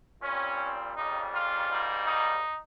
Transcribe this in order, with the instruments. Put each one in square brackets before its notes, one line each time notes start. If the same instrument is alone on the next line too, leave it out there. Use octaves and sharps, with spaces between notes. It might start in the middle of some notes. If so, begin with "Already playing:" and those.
[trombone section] A#2 G3 C4 C#4
F2 C#3 G3 D#4
F4
G#2 G3 A#3
D#4